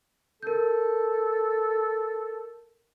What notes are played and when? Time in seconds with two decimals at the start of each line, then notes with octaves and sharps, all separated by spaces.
0.43 A4 A#4 G6